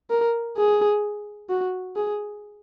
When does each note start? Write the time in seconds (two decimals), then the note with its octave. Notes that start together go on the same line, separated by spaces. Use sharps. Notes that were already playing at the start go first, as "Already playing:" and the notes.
0.10 A#4
0.57 G#4
1.50 F#4
1.96 G#4